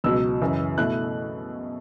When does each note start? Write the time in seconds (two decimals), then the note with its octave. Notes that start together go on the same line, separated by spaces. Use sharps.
0.04 C#2 B2 F#3 E6
0.41 F#2 C#3 E3
0.78 B2 A3 E4 F#6